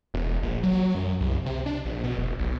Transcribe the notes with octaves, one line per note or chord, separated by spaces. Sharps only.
E1
A#1
F#3
F#2
C2
C3
D4
A#1
B2
F1
B1